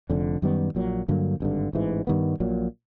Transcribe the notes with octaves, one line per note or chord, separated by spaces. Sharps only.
F1 F2 D3
F#2 D#3 G3 B3
A#1 A#2 F#3
G2 D3 F#3 A#3
G#1 G2 D3
A1 G#2 E3
G2 D#3 G3 B3
A#1 A#2 F#3